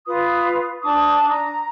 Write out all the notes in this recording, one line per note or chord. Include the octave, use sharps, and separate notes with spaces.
F4 B4 D#6
D4 A5 D6 D#6
A#5